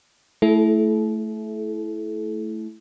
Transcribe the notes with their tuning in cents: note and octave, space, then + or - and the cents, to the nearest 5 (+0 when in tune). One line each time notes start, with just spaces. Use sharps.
A3 +0 E4 +0 A4 -40